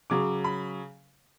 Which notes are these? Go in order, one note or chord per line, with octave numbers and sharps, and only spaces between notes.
C#3 F#3 D6
B5